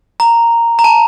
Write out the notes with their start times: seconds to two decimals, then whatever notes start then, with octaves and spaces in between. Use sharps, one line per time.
0.20 A#5
0.79 A#5
0.84 A5